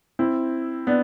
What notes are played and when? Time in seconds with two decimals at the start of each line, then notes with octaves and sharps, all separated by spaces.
0.19 C4 E4
0.87 B3 D4